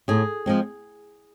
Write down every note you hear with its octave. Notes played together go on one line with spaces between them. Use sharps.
A2 G#4
F3 G#3 C4